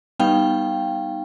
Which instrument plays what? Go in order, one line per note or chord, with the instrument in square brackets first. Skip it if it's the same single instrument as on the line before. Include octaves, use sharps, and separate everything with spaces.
[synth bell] G3 B3 D#4 F5 G5